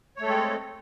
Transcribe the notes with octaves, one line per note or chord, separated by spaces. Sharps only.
G#3 A3 C4 A4 C#5